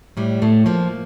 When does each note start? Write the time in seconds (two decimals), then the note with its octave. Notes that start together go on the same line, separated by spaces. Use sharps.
0.17 A2 G3
0.42 A2 A3
0.66 F3 A#3